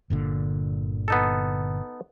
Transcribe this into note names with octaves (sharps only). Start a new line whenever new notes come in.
G1 A#2 D3
B3 D#4 A4